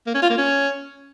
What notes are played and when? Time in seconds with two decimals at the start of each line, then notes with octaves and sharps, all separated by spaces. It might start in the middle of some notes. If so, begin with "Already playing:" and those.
0.07 A#3
0.14 C#4
0.22 F4
0.30 A#3
0.38 C#4